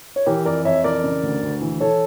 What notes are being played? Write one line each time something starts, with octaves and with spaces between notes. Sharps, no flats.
C#5
E3 G4 A#4
F2 A#4 D5
F2 C#5 E5
E3 A#4 D5
C#3
D2
D2
E3
E3 A4 C#5